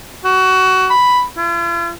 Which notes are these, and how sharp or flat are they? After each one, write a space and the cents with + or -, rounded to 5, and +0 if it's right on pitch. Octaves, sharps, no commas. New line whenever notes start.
F#4 +20
B5 +0
F4 -45